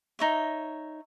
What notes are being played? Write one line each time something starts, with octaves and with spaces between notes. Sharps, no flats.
D#4 C#5 E5